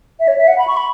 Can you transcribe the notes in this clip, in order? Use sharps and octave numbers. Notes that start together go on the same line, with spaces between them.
E5
C#5
E5
F#5
B5
C#6
B5